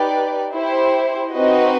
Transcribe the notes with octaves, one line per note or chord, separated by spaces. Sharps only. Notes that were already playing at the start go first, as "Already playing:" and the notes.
Already playing: D#4 G4 B4 D5
E4 G4 C5
C4 D#4 F#4 B4 D#5